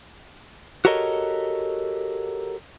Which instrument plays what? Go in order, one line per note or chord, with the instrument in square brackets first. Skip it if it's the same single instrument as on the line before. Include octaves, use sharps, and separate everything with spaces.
[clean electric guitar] F#4 G4 A4 A#4 C#5 D#5